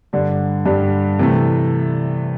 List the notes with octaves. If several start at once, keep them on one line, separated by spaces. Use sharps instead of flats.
G2 D3 G3 D4
G2 D3 G3 D4
C3 E3 A3